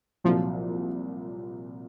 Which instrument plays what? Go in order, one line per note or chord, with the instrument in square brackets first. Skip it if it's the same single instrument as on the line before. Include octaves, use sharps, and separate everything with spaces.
[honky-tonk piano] C2 A#2 F#3 [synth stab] F3